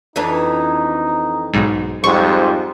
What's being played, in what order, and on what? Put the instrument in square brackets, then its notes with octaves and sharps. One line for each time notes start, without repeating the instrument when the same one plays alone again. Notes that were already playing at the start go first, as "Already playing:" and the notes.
[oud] F2 E3 D4 [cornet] D#4
[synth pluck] B1 G#2
[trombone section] F2 G#2 G3 [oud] F3 [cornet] C5 [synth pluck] C#6